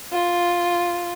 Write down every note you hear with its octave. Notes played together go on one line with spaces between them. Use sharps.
F4